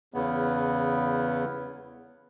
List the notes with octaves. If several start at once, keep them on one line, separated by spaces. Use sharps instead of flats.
E2 C#3 B3